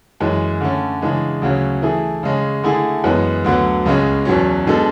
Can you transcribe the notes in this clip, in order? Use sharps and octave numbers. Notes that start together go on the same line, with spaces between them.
F#2 E3 G#3
D3 A3 C#4
C#3 E3 G#3 D4
D2 C#3 F#3 C#4
E3 A3 E4 G#4
C#3 G#3 C#4
D3 A3 E4 G#4
F#2 E3 G#3 B3
D2 D3 F#3 B3
C#2 C#3 G#3 C#4
E2 B2 F#3 C#4
B2 G#3 D4 A4